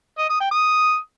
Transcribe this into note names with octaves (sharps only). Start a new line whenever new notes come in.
D#5
D#6
G5
D#6